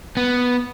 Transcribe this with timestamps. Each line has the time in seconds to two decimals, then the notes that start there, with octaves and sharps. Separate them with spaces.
0.17 B3